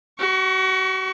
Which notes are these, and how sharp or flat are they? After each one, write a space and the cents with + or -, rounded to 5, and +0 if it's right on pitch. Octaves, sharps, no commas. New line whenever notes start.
F#4 +35 C#6 +0